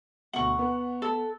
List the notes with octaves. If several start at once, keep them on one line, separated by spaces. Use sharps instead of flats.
D2 B2 F#5 C#6 F#7
B3
A4